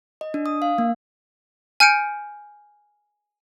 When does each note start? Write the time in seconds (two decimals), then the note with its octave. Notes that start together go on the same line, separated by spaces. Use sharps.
0.21 D#5
0.34 D4
0.46 D#6
0.62 F5
0.78 A#3
1.80 G#5 F6 G6 C#7 D7